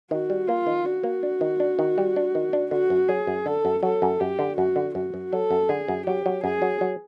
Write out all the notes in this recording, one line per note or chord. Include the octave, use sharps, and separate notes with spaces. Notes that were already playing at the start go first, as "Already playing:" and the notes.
D#3 F#4
G3
A#3 F4
D#3
D4 F#4
A#3
D4
D#3
D4
D#3
G3
D4
D#3
D4
D3 F#4
F#2
F#3 G#4
F#2
D3 A4
F#2
F#3 A4
F#2
F#2 G4
D3
F#2 F#4
D3
F#2 F#4
F#2
F#3 A4
F#2
D3 G#4
F#2
F#3 G4
F#3
F#2 G#4
F#3
F#3